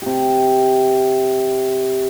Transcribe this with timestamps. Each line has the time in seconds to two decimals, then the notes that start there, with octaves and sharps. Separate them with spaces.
0.02 C3 G4